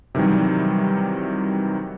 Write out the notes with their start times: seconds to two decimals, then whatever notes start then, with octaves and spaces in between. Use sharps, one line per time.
0.15 C3 D#3 E3 F#3 G3